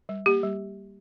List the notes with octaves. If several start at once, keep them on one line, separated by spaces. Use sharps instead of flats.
G3
A#3 G4
G3